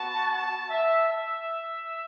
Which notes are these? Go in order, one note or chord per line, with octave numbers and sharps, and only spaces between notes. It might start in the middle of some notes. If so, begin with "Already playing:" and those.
Already playing: B3 F#4 A5
A5
E5
E5